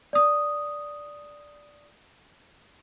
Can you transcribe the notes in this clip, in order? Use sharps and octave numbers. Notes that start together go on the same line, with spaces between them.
D5 D#6